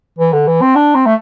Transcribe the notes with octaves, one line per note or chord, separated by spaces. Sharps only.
E3
D3
E3
C4
D4
C4
A3